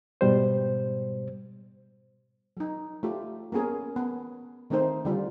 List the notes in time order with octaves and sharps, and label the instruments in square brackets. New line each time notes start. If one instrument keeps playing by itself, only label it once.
[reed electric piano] G#2 B2 G3 C5
[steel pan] F#3 D#4
A3 F4 G4
A#3 B3 C#4 G#4 A#4
B3
D#3 A3 C4 D#4 C5
D3 G3 F4